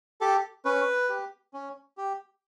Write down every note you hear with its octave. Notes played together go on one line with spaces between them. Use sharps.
G4 A4
C#4 B4
G4
C#4
G4